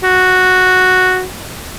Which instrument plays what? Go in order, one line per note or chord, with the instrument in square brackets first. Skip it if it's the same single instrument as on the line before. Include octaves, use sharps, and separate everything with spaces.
[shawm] F#4